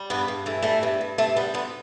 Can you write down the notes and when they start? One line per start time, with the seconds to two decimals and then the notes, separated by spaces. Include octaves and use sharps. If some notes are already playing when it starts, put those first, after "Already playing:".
Already playing: G3
0.10 G2 B3
0.28 G2
0.46 E3 A3
0.62 G3 A3
0.83 G2
1.01 G2
1.18 C3 A3
1.36 G3 B3
1.54 D2 B3